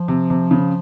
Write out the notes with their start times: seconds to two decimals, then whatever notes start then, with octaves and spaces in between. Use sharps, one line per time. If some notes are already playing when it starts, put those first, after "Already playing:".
Already playing: F3
0.08 C3
0.30 C3
0.51 C#3